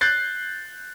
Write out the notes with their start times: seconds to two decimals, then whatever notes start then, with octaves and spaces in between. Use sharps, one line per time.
0.01 F#6 G6 A6 C7